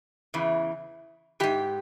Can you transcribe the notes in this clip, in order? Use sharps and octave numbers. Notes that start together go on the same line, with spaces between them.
E2 C#3 E3
G#2 E3 G4